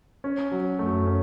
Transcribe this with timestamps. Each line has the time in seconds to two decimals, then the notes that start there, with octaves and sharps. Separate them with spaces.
0.24 C#4
0.51 F#3
0.79 F#2 A3
1.07 C#4